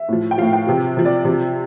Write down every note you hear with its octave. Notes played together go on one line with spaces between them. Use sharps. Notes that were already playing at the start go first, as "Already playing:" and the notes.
Already playing: E5
A2 F3
G5
A2 F3 F5
G5
C3 F3
C3 F3
D5
C3 F3